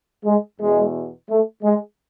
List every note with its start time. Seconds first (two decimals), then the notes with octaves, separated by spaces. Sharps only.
0.24 G#3
0.59 E2 B2 G#3
1.28 A3
1.63 G#3